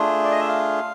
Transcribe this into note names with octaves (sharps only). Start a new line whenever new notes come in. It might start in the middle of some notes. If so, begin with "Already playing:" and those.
Already playing: A3 D4 F4 G#4
D5
D#5
E5
F5